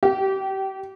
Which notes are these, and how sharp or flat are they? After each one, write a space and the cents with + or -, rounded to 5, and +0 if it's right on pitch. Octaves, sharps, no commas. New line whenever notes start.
G4 -25